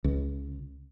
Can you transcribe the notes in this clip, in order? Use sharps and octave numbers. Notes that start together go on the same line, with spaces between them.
C#2